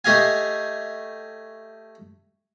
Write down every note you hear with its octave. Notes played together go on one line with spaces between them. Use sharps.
A3 G4 D#5 F5 G#5